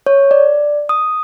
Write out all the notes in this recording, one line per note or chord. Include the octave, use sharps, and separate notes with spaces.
C#5
D5
D#6